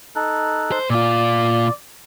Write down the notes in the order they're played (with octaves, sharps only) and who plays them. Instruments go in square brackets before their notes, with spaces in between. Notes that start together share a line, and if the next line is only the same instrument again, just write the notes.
[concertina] D#4 A4 F#6
[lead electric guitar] C5
[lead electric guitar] A#2 F4 [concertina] D5